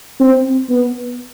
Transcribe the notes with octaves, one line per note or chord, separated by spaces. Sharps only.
C4
B3